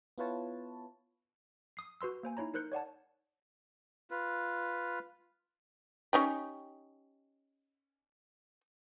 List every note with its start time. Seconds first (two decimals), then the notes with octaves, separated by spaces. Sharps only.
0.18 B3 E4 F4 B4 C#5 A5
1.77 D#6 C7
2.01 F#4 B4 C6 E6
2.23 A#3 C5 G#5
2.37 D#4 E4 C#5 A#5
2.54 D#4 A#4 C5 F#6 G6 C#7
2.72 C#5 D5 F#5 A5
4.11 F4 B4
6.13 C#4 D#4 G4